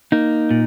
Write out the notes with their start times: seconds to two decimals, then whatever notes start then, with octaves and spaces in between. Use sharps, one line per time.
0.12 A#3 D#4
0.51 A#2